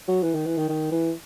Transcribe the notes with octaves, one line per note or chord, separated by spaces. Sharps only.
F#3
E3
D#3
E3
D#3
D#3
E3